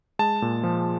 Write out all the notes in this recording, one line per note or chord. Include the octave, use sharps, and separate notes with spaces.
G#3 A5
A#2
F3